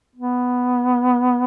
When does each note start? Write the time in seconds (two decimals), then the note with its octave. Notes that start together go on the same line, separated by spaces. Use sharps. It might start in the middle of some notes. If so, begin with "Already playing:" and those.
0.16 B3